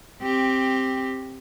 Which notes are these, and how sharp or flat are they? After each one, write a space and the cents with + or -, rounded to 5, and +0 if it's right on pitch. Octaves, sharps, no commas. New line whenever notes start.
C4 +10 G4 +0